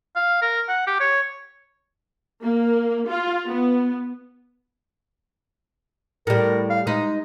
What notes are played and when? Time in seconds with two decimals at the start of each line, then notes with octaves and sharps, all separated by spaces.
0.16 F5
0.42 A#4
0.69 F#5
0.87 G4
1.00 C#5
2.41 A#3
3.09 F4
3.48 B3
6.27 A2 G3 A#4
6.70 F5
6.87 G#3 D#4 B4 D#5